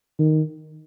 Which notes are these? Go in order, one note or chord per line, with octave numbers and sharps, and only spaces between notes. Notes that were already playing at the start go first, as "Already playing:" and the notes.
D#3